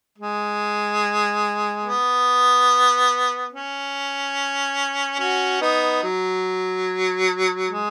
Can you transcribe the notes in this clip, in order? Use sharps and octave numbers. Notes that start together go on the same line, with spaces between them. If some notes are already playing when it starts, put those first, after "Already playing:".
G#3
B3
C#4
C#4 F#4
B3 D#4
F#3
G#3